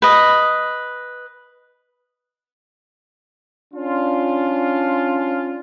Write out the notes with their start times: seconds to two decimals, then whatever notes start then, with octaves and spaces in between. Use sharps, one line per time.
0.02 B4 D#5
3.73 C#4 D4 F4